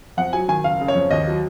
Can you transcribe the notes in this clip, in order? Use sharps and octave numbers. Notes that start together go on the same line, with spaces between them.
F2 F#5
F#3 G#5
D#3 G#5
F#1 F5
C#3
C#5
F2
D#2 D#5
F#3